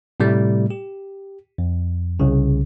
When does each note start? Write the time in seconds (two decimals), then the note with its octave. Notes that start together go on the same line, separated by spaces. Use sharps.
0.20 A2 C3 G3 A3
0.70 G4
1.58 F2
2.20 C2 C#3